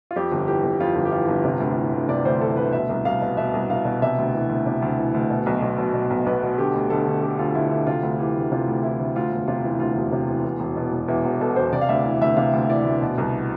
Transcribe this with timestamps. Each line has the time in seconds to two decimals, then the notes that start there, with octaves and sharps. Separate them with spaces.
0.11 F4
0.16 F2 G4
0.32 G1
0.48 E3 G4
0.64 G1
0.80 F2 F4
0.96 G1
1.05 G4
1.12 E3 F4
1.28 G1
1.45 C3
1.60 D2
1.77 E3
1.93 D2
2.09 C3 D5
2.25 D2 C5
2.41 E3 A4
2.57 D2 B4
2.73 B2 E5
2.89 C2
3.05 C2 F5
3.21 B2
3.37 B2 E5
3.53 C2
3.69 C2 F5
3.85 B2
4.02 C3 E5
4.18 D2
4.34 E3
4.49 D2
4.66 C3
4.82 D2
4.98 E3
5.14 D2
5.30 B2
5.46 B1
5.62 B1
5.78 B2
5.94 B2
6.10 B1
6.26 B1 B4
6.43 B2
6.58 D3 G4
6.74 D2
6.90 D2 A4
7.07 D3
7.22 D3 G4
7.39 D2 F4
7.55 D2 E4
7.71 D3 E4
7.87 C3 F4
8.03 D2
8.19 E3 G4
8.36 D2
8.52 C3 F4
8.68 D2
8.83 E3 E4
8.99 D2
9.16 D2 F4
9.32 E1
9.48 C3 F4
9.65 E3
9.80 D2 F4
9.96 E1
10.12 C3
10.28 E3
10.44 E2
10.60 E1
10.76 B2
10.92 E1
11.08 E2 E4
11.25 E1
11.41 B2 A4
11.56 E1 C5
11.72 C3 D5
11.81 F5
11.89 D2 E5
12.05 E3
12.21 D2 E5
12.37 C3 F5
12.53 D2
12.69 E3 D5
12.85 D2
13.02 B2
13.18 C2